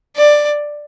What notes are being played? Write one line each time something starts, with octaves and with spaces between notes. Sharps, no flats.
D5